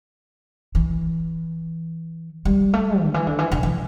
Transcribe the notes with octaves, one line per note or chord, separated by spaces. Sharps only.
E3
G3
A3
D3
E3
D3
E3
D3
E3